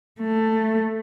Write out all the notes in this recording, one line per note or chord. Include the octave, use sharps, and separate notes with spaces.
A3